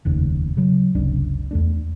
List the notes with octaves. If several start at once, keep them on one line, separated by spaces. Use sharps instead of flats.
F1 D#2 C#3
C#3 F#3
F#1 C#2 C3 D4
E2 A3 D4